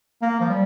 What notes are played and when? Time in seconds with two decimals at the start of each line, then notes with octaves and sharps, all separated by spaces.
0.22 A#3
0.40 F3
0.49 G3